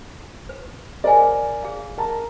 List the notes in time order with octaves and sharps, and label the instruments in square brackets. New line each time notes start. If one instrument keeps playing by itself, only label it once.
[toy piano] B4
[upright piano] A#4 C5 D5 [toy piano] E5 F5 G#5
[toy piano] G#4 F5
[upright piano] A#4 A5 A#5